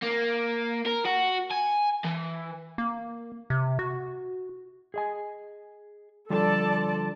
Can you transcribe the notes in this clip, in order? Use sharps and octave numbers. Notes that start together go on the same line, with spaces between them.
A#3
A#4
F#4
G#5
E3
A#3
C3
F#4
G#4 D#5 G#5
D3 F3 G3 A4 D5 A5